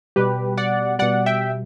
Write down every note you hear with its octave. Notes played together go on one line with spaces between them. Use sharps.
B2 G3 G4 B4
D5 F#5
B2 G3 D5 F#5
E5 G5